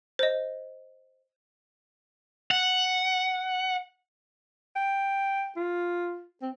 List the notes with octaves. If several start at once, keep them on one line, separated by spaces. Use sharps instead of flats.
C5 D#5
F#5
G5
F4
C4